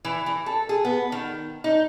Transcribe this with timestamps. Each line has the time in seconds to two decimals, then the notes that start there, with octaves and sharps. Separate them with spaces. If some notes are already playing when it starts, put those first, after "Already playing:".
0.05 E3
0.26 E3
0.46 A4
0.69 G#4
0.85 B3
1.12 D#3
1.64 D#4